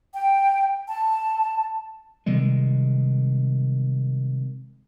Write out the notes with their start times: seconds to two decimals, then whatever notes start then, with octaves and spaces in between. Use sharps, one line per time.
0.14 G5
0.88 A5
2.26 C3 D#3 G3 G#3